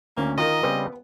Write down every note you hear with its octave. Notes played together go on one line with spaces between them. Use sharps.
D2 A#3 C#4
D#3 F4 A#4 D#5 A#5
C#3 G3 B3 C4